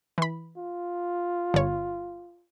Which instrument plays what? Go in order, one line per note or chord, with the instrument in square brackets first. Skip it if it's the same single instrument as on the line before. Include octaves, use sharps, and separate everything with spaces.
[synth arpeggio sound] E3 B5
[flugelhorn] F4
[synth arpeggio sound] G1 C#5